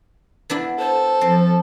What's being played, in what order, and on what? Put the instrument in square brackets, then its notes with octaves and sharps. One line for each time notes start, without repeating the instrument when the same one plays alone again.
[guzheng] B3 D4 E4
[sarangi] A4 [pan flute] C5
[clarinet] F3 [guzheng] C4